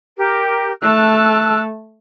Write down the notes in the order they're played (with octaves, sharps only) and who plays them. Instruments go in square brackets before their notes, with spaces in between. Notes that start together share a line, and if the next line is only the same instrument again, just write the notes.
[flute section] G4 A#4
[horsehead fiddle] A3 A5 [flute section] E6 F#6